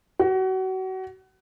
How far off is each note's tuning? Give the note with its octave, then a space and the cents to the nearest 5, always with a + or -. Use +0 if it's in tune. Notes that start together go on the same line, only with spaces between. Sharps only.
F#4 +30